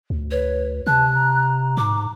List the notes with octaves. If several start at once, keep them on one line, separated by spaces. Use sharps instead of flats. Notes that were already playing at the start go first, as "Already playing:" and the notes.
D2
B4 C#5
C3 A5 F#6
A#5
G#2 D6